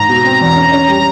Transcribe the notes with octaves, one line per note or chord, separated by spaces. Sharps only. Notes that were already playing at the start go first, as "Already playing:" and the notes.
Already playing: G#2 A#5
B2
C4
E2
C#4
C#4
G3